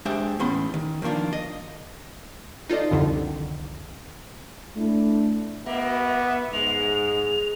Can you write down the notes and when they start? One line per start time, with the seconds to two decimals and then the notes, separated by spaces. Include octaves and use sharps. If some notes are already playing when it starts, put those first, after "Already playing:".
0.05 G#3 D4 G4 C5 E5
0.39 E2 A2 B3 C#4 B5 C6
0.74 D#3
1.02 D#3 F3 A#3 D4 F4
1.33 D#5
2.70 D#4 F4 A4 D5 D#5
2.91 C2 F2 D3 D#3
4.76 A3 D4 E4
5.66 B2 A#3 B3 E5
6.53 G#2 G#3 F7